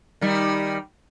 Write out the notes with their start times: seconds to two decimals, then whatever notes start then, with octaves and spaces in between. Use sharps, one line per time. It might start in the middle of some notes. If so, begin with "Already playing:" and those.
0.21 D#3 G3